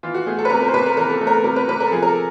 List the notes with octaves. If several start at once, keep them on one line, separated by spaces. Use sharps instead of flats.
E3 F4
F#4
A3 G#4
A4
B4
C3 A#4
A#4
C5
C3 B4
A#4
E3 A#4
A4
A3 A4
A#4
A4
C3 A#4
B4
C3 B4
A#4
A4
F3 G#4
A#4
A4